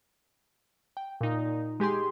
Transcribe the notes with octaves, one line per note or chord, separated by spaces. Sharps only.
G5
A#2 D#4
G#3 G4 G#4 C6